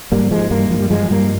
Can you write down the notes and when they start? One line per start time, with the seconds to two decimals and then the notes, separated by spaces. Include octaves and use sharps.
0.12 G#2 G3 A#3
0.31 G#2 F3 G#3
0.51 G2 G3 A#3
0.70 G2 F3
0.80 G3
0.90 G2 F3 G#3
1.10 G2 G3 A#3